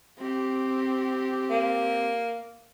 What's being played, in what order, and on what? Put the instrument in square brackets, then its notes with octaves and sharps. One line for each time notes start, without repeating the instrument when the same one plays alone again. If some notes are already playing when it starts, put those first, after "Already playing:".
[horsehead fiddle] C4 G4
[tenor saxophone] A#3